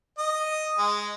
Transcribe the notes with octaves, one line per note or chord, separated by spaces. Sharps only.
D#5 D#6
G#3